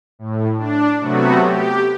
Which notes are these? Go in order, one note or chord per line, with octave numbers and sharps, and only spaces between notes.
A2
D4
C3 F#3 A3 B3 F#4
G4